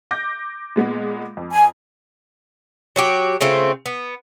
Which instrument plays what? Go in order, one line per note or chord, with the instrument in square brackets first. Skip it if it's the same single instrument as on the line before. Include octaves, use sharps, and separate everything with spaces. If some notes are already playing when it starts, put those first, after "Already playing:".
[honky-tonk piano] D6 G6 A#6
A#2 G#3 B3
F2
[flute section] G#5
[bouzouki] F#3 F#4 G4
C#3 A3 C4 F4
B3